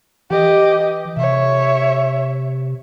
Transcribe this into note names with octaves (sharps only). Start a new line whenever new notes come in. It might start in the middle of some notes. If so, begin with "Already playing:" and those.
E3 G4 D#5
C3 C#5 E5